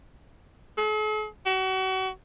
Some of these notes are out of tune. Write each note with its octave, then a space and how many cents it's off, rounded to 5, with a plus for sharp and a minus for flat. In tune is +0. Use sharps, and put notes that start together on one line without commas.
A4 -45
F#4 +35